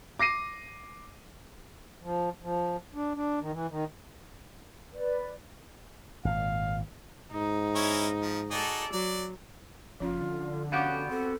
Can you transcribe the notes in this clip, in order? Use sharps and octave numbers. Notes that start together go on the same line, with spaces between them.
D6 A#6 C7 D#7
F3
F3
D4
D4
D#3
E3
D#3
B4 D5
G#1 A#2 F5
G#2 D#4
C#4 E4 C#5
F3
D#4 F#4 G#4 A4 D5
F#3 D5
F#1 F3 C#4 F4
D3
B3 C#4 F#4 G4 F5 F#5 D6
C4 A4